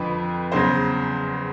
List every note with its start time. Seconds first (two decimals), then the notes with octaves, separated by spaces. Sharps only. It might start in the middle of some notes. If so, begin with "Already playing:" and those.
Already playing: F2 D3 F3 B4
0.52 E2 C#3 F#3 C5